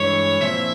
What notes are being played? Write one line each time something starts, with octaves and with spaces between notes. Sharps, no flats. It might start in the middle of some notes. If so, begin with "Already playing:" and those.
Already playing: G2 E3 G#3 E4 C#5
A#2 F3 C4 E4 E5